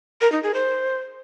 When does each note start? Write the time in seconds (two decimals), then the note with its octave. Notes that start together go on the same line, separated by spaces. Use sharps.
0.21 A#4
0.32 D#4
0.43 G#4
0.54 C5